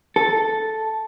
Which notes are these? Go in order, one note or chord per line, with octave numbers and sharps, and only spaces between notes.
A4